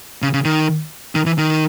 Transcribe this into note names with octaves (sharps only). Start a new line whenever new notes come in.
C#3
C#3
D#3
D#3
E3
D#3